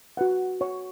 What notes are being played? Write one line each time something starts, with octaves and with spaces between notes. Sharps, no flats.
F#4 B4 F#5
F#4 C#5 F#5 C#6